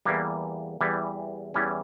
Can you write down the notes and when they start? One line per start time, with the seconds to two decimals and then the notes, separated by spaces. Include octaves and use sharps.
0.05 E2 E3 G3 A#3
0.81 E2 E3 G3
1.54 E2 E3 G3 C#4